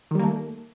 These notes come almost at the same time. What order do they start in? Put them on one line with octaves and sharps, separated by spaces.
D#3 G3 A#3 A3